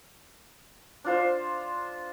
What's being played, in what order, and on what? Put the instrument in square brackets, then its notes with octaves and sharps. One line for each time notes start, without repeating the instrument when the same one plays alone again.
[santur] D4 F4 C5